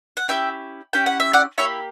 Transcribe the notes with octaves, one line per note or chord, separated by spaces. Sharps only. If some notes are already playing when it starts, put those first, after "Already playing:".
F#5
C#4 E4 G4 E5 G5
C#4 E4 G4 G5
F#5
E5
D5 F#5
A#3 E4 G4 C#5 E5